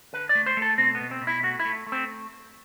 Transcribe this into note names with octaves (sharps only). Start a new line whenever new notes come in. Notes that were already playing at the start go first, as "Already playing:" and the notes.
D3 B4
D5
A3
C5
A3
A4
B2 C4
B3
B2
C4
B2
E4
A3 F#4
E4
A3
A3
C4